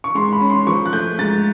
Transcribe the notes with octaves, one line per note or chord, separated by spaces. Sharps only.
C#6
G#2 C6
B5
C#4
C6
F3 C#6
F#6
A3 G6
G#2 A6